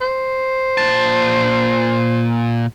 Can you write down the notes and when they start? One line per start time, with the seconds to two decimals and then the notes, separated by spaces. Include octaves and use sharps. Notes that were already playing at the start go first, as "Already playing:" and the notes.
0.01 C5
0.78 A#2 A5